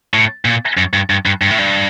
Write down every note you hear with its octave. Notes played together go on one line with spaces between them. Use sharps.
A2
A#2
F#2
G2
G2
G2
G2
A2
G2